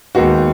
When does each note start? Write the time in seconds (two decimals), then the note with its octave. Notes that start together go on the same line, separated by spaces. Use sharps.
0.15 D#2 D#3 G#3 B3 F#4